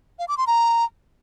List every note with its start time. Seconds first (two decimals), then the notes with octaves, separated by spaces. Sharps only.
0.19 F5
0.28 D6
0.38 C6
0.47 A#5